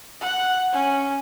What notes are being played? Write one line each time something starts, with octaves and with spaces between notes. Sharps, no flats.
F#5
C#4